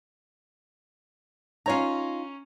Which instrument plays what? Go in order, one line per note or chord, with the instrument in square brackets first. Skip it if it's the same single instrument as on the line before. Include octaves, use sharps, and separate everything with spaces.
[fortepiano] C#4 C#5 A#5 [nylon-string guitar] D#4 F4